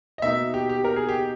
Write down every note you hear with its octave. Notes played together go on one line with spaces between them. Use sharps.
D#5
B2 A#3 D#4 E5
G4
G4
A#4
G#4
G4